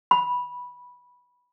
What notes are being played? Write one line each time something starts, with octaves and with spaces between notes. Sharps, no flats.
B5